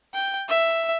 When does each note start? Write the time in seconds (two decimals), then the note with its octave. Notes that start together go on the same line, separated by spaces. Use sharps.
0.14 G5
0.49 E5